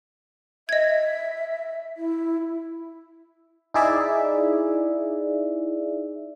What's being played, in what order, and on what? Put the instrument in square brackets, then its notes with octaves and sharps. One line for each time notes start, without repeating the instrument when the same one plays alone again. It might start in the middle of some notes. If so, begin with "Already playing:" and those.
[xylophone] D#5 G#6 [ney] E5
[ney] E4
[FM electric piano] D#4 E4 G#4 D5 E5